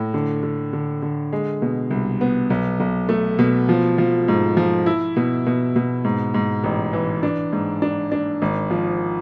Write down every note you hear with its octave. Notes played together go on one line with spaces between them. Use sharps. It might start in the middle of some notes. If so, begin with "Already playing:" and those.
Already playing: A2
D3
D3
D3
D3
G#3
B2
C2
B3
B1
B1
A3
B2
F3
F3
G#2
F3
E4
B2
B2
B2
G#2
G#2
A1
E3
D4
G#2
D4
D4
G#1
F3